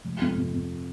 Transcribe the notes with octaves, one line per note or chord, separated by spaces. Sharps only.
F1
F2
C3
C3